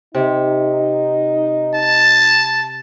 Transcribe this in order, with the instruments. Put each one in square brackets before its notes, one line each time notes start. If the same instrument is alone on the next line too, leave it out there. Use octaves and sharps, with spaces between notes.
[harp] C3 [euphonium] D#4
[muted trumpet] A5